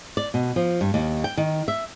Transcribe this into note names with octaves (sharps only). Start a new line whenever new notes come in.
D5
B2
F3
G2
D#2
G5
D#3
E5